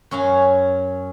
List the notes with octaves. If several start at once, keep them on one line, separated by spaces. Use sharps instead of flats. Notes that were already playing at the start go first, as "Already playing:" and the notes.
F#2 C#4 F5 G#5